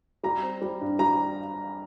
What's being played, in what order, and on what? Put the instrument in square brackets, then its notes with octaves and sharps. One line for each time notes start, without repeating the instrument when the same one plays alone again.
[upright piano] G3 A#5
C4
G3
G2
G3 A#5